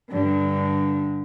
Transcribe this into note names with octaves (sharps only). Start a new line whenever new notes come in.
G2 D3